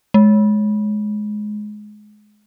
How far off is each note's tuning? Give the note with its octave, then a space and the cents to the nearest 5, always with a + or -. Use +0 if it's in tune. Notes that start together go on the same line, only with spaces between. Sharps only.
G#3 +20